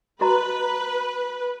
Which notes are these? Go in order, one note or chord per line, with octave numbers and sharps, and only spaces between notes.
F#4 B4 D#5 A#5